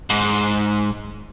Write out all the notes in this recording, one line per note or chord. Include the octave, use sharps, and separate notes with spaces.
G#2